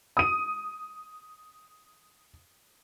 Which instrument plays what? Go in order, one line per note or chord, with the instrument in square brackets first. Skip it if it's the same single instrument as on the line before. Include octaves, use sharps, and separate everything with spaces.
[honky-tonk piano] D#6 D#7